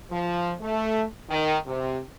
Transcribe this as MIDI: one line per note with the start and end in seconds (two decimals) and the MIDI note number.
0.10 0.52 53
0.61 1.04 57
1.29 1.56 51
1.66 1.99 48